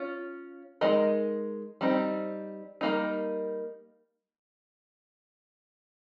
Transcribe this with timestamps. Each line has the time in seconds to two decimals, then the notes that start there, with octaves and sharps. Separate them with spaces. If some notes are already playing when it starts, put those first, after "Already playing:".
Already playing: C#4 F4
0.81 G#3 D#4 A#4 D#5
1.81 G3 C4 D#4
2.81 G3 A#3 D#4